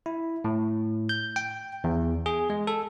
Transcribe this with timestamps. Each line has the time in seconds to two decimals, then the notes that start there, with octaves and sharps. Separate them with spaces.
0.06 E4
0.45 A2
1.09 G6
1.36 G5
1.84 E2
2.26 G#4
2.50 G#3
2.67 A4